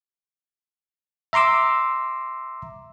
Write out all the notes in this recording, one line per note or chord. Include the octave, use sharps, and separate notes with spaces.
E5 A#5 C6 D6 E6